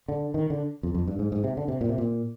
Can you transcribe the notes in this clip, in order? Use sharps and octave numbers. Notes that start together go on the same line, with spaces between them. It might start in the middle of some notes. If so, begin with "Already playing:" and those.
D3
D#3
D3
F2
F2
G2
G#2
G#2
C3
D3
C3
A#2
C3
A#2